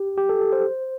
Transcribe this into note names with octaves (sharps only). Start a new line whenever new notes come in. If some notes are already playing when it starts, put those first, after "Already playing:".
Already playing: G4
G4
A4
A4
C5